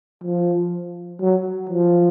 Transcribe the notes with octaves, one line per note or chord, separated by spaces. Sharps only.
F3
F#3
F3